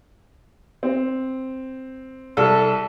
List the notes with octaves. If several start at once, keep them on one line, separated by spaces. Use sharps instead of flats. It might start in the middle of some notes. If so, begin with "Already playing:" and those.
C4
C2 A4